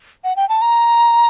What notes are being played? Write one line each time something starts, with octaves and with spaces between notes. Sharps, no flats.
F#5
G5
A5
A#5